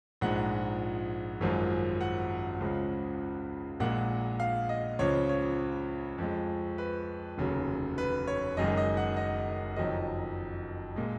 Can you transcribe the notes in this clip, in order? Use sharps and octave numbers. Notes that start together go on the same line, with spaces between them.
A#1 G#2 F3 G#3 F#5
G#1 F#2 F3 G#3
F#5
C#2 C#3 F3 G#3
A#1 A#2 G#3 F#5
F5
D#5
C#2 C#3 F3 C#5
C#5
F2 F3 G#3
B4
F1 D#2 C#3 F#3
B4
C#5
F#1 F#2 D#3 G#3 D#5
D#5
F#5
D#5
F#1 F2 D#3 F#3 D#5
A#2 G#3